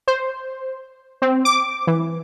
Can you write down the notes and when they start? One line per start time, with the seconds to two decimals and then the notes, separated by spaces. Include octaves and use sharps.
0.08 C5
1.22 C4
1.45 D6
1.87 E3